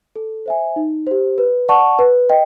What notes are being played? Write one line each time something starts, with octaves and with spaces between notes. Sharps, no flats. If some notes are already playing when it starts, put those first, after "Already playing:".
A4
C5 E5 G#5
D#4
G4 C5
B4
D5 F#5 A5 C#6
B4
D#5 G5